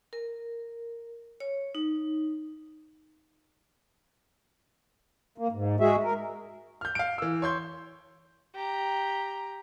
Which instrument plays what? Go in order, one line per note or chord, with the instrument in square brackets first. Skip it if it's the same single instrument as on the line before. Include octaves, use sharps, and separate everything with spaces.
[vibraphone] A#4
C#5
D#4
[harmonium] A#3
G#2
G#3 F#4 G#4 E5
A#4
[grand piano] F6 G6
F5 D7
E3 E6
C#5 C6 G6
[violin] G4 A#5